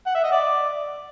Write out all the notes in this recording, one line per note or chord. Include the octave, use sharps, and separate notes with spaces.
F#5
E5
D#5
D5